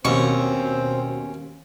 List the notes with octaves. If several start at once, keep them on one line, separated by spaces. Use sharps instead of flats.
D#2 B2 C4 C#4 C5 C#6